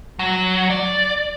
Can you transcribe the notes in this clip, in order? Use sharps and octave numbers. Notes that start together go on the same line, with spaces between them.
F#3
D5